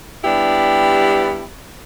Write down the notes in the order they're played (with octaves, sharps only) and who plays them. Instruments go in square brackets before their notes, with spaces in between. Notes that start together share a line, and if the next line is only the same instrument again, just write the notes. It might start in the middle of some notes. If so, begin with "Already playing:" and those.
[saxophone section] G3 B3 D4 E4 G4